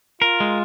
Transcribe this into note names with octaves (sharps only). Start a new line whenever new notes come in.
F4 A#4
G#3